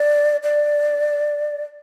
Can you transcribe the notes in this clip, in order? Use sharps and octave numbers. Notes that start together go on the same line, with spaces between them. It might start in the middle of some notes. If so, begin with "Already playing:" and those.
Already playing: D5
D5